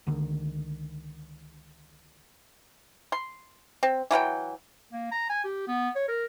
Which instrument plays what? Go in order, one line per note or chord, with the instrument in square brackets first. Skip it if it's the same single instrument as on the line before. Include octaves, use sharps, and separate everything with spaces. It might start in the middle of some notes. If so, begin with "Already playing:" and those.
[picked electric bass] C#2 D3 D#3
[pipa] C6
C4
E3 F#3 F#5 G5
[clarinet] A#3
A#5
G#5
G4
B3
C#5
A#4